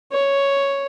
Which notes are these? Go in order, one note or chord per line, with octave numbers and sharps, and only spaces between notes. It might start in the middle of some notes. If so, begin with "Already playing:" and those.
C#5